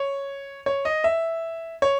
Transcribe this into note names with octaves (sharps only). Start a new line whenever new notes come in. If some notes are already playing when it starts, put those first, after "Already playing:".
Already playing: C#5
C#5
D#5
E5
C#5